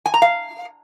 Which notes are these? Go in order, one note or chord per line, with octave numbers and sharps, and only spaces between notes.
G#5
A#5
F5